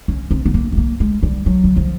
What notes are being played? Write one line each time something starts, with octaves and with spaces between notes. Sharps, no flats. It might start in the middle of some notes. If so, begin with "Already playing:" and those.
C#4
C4
B3
A#3
A3
A#3
G#3
G3
F#3
E3
F3